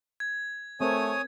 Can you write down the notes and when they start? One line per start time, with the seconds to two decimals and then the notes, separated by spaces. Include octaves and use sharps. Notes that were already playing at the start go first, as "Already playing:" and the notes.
0.20 G#6
0.81 A3 C4 A#4 C#5 G#5 D#6